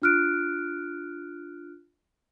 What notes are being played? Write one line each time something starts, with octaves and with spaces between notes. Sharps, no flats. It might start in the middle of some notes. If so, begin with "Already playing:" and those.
D4 F4 F6 F#6 D7